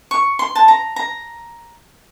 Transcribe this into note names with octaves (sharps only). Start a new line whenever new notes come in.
C#6
C6
A5
A#5
A#5